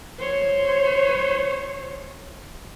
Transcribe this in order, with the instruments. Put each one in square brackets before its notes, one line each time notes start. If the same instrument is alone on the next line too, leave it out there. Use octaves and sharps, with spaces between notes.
[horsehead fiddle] C5 C#5